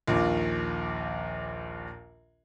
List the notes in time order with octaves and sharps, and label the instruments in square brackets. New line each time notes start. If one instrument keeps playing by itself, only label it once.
[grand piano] A#1 D#2 A#2